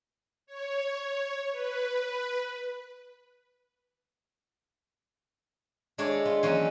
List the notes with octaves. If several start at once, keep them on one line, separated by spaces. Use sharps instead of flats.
C#5
B4
G#3 D4 E4 A4 C#5
B3 F4
E3 F#3 A#3 C#4 D#4